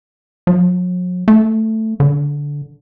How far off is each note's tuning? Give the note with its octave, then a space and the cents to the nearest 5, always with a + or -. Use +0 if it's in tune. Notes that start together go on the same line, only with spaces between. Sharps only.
F#3 -45
A3 +5
D3 -15